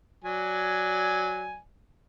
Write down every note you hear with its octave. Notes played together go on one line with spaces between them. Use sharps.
F#3 D5 G#5